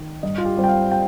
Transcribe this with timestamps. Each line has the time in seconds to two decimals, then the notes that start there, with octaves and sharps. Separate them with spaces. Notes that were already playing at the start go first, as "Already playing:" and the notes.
Already playing: D#3
0.23 G2 D#5
0.38 F4
0.45 G4
0.57 G3 C4
0.64 G5
0.69 F5
0.92 G5